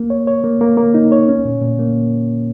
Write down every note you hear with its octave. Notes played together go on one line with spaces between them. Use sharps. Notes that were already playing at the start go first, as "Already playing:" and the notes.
Already playing: A#3
C#5
C#5
A#3
A#3
A#3
D#4
C#5
C#4
A#2
A#2
A#3